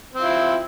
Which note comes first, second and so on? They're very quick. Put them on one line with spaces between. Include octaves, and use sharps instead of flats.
C4 F4 E4